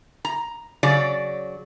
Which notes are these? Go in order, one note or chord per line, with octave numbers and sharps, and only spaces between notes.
A#5
C#3 F#3 D5